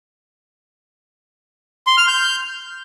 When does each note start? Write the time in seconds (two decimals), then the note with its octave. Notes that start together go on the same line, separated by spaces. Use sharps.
1.87 C6
1.97 F6
2.08 G6